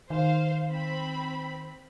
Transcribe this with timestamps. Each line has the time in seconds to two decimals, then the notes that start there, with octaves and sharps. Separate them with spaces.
0.10 D#3 C5 F5
0.70 C4 B5